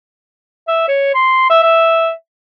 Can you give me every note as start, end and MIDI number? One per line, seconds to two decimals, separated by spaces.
0.68 0.87 76
0.88 1.10 73
1.14 1.48 84
1.50 1.62 76
1.63 2.11 76